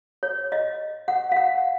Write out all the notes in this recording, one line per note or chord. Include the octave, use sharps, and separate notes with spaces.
C#5
D#5
F#5
F5
F#5